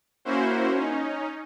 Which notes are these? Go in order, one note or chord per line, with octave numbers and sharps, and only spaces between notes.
A#3 C#4 E4 F#4 C5
C#4 D#4